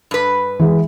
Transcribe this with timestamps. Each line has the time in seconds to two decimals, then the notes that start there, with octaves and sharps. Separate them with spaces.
0.11 G2 B4
0.59 E3 G#3